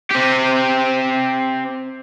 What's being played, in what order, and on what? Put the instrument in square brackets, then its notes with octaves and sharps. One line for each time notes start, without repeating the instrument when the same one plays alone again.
[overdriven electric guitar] C4 G4